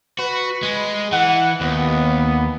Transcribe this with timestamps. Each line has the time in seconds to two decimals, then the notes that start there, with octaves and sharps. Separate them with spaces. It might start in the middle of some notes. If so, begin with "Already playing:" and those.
0.19 F#4 B4
0.63 G#3
1.12 E3 F#5
1.61 D#2 B3